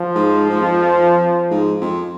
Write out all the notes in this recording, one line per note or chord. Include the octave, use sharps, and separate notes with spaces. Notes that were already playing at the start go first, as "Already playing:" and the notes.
Already playing: F3
G#2
G#2
F2
G#2
F2